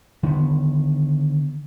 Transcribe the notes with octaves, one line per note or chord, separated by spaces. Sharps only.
D3 D#3 B3